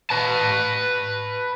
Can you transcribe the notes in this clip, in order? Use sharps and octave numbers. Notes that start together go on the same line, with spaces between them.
B4 A5